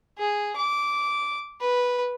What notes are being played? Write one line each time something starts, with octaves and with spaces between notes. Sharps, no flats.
G#4
D6
B4